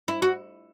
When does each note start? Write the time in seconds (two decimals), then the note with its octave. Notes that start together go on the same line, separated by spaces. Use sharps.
0.08 E4
0.22 F#4